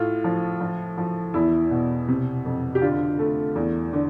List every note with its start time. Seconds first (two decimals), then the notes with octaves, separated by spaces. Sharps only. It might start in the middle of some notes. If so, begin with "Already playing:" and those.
Already playing: A2 F4
0.24 F3
0.61 F3
0.98 F3
1.34 E2 E4
1.71 B2
2.08 C3
2.45 F2
2.75 G4
2.82 D3 F4
3.19 A3
3.55 E2
3.93 D3